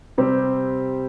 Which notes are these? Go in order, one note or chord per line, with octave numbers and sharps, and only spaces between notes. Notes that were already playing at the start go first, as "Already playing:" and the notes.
C3 G3 C4 G4